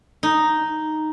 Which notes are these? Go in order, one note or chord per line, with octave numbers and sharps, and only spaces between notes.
D#4